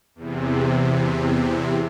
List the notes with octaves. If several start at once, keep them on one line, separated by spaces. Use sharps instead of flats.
E2 C3